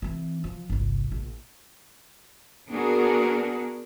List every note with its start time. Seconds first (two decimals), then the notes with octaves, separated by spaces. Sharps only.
0.02 E3 C4
0.44 F3
0.70 G1 C2
1.12 A#1
2.69 B3 D4 F#4 G#4 A#4